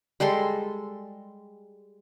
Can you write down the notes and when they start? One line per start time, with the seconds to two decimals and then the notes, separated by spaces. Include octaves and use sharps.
0.20 G3 G#3 A4 C6